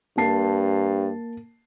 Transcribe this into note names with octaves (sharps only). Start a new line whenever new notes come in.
G2 A#3 A5 C7